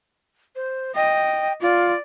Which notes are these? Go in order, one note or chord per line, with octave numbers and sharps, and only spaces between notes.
C5
D#5 G5
F4 D5